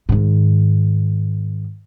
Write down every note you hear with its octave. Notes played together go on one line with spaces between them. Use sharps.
G#2 D#3